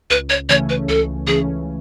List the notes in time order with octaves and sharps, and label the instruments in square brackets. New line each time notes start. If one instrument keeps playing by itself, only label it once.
[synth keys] C#2 [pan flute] B4
[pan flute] C#5
[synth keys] C#3 E3 A3 C#4 [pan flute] C#5
[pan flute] B4
[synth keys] C#2 [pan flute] A4
[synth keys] C#3 E3 A3 C#4 [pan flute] G#4